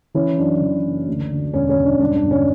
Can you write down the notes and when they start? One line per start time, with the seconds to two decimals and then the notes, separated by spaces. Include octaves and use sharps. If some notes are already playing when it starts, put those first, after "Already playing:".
0.14 E3 C#4 E4
0.38 F#2 D4
0.61 E3
0.85 F#1
1.08 D2
1.31 D3
1.54 E1 C#4
1.69 C#4
1.77 E1
1.85 D4
2.01 G2 D4
2.16 D4
2.24 G1
2.31 C#4